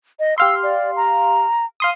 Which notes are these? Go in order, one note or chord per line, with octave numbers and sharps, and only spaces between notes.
D#5
G4 F5 C6 E6
D5
A#5
F5 C6 D#6